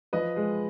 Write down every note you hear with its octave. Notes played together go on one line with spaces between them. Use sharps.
F3 B4 D#5
G#3